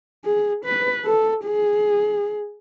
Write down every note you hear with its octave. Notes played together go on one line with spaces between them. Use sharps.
G#4
B4
A4
G#4